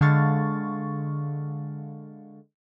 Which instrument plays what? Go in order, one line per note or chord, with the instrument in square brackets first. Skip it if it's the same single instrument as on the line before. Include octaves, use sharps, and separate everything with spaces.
[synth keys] D3 G#3 F5 C#6 A6